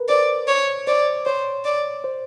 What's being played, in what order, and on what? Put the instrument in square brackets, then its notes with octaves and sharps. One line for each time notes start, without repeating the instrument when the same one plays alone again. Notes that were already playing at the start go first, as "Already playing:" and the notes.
Already playing: [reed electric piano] A#4 B4
[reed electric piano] C5 [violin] D5
[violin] C#5
[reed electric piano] C5 [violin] D5
[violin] C5 [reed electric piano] C#5
[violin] D5
[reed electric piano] C5